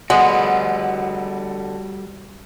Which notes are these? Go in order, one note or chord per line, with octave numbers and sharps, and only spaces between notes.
D3 G3 G#3 B3 F#4 F#5